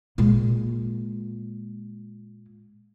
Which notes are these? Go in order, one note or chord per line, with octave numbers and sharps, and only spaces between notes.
A#2 G#3